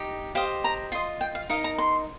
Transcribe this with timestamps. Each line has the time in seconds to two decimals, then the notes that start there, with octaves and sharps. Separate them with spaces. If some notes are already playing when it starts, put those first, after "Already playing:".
Already playing: D#4 G4 D#5
0.35 G4 C5 D#5 F5
0.64 A#5
0.92 F4 D#5 C6
1.21 G5
1.35 F5
1.50 D#4 A#4 D#5 F5
1.64 A#5
1.78 C6